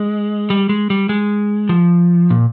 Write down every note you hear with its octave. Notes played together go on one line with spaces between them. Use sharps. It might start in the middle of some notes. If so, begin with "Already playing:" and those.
Already playing: G#3
G3
G#3
G3
G#3
F3
A#2